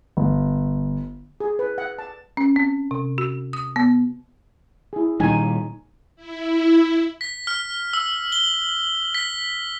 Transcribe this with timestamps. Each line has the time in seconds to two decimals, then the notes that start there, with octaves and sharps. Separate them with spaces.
0.17 G1
1.40 G#4
1.59 B4
1.78 F#5
1.99 A5
2.37 C#4
2.56 C4
2.91 C3
3.18 F#4
3.53 D#6
3.76 B3
4.93 E4 G#4
5.20 A#2 D#3 G3 D#4 G#5
6.16 E4
7.21 B6
7.47 F6
7.93 E6
8.32 G7
9.15 B6